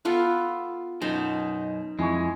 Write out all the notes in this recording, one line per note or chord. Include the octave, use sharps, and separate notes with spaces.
B3 F4 A4
F#2 B2 D#4 C5
F2 G#3 E4 G#5 C#6